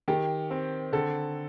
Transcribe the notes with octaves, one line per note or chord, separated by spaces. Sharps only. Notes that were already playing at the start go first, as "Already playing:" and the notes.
D#3 G4
C4
D3 A4